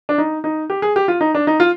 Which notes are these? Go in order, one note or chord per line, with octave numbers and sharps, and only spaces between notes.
D4
D#4
D#4
G4
G#4
G4
F4
D#4
D4
D#4
F4